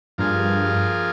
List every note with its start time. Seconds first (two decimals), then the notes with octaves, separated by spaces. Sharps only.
0.18 G2 F3 A#3 F4 G#4